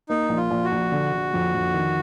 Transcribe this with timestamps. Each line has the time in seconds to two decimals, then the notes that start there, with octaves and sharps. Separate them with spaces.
0.09 A#3 D#4
0.29 A#1
0.37 F4
0.51 A#1
0.64 F#4
0.72 A#1
0.92 D3
1.12 D3
1.34 F2
1.55 F2
1.74 D#3